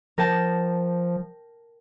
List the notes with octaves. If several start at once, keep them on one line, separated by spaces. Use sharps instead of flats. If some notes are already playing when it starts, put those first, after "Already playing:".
F3 A#4 G5 A5